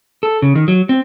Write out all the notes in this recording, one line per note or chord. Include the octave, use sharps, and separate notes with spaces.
A4
C#3
D#3
F#3
C4